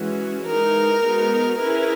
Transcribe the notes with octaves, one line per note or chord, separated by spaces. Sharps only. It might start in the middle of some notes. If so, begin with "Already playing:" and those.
Already playing: E3 G#3 C#4 F#4
E3 G#3 D#4 A#4
G#3 B3 D#4 F#4
C#4 E4 G#4 A#4 B4